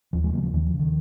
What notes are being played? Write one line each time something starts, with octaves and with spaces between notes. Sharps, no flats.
D#2 F3
F3 G#3
C#3 F#3 A#3
F3
D#2 D#3
F3
C#3
D#3